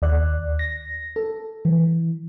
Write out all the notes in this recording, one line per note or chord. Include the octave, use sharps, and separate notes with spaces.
D#2 D5 F#6
A#6
A4
E3